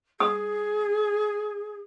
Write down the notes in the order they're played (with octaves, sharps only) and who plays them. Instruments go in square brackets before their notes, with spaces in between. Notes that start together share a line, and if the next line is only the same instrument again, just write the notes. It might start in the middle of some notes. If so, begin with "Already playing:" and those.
[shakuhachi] G#4 [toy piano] D#6